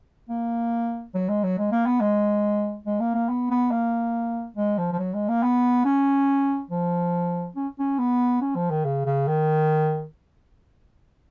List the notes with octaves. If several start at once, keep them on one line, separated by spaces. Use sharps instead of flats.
A#3
F#3
G#3
F#3
G#3
A#3
B3
G#3
G#3
A#3
A#3
B3
B3
A#3
G#3
F3
F3
F#3
G#3
A#3
B3
C#4
F3
C#4
C#4
B3
C#4
F3
D#3
C#3
C#3
D#3